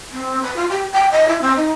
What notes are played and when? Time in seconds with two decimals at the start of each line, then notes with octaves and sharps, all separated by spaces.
0.12 C4
0.42 B4
0.56 F4
0.70 G4
0.92 G5
1.12 D#5
1.28 E4
1.41 C4
1.57 D#4